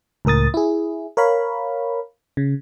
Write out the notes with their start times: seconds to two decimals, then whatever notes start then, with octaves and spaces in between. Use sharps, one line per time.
0.25 C#2 A2 A#4 D#6 A6
0.54 E4 G#4
1.17 A#4 C#5 F5 B5
2.37 C#3